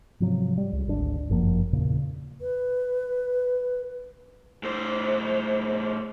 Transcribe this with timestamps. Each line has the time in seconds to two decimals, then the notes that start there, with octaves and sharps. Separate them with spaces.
0.20 G#2 C3 F3 F#3
0.58 G3
0.72 C#2
0.88 G#1 D2 D4
1.29 G1 F#2 F3 A#3
1.73 E2 A#2 C#3
2.40 B4
4.63 A2 C5